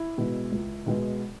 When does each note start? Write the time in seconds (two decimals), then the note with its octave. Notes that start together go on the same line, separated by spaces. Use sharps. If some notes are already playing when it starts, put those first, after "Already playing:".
Already playing: E4
0.18 B2 G#3 B3
0.52 C#2
0.86 B2 G#3 B3